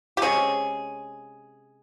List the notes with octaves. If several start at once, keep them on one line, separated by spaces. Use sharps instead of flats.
G4
C3 F3 G#3 C#4 G#4